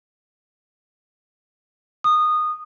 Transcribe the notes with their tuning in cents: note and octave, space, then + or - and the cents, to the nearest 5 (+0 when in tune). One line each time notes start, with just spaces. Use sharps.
D#6 -20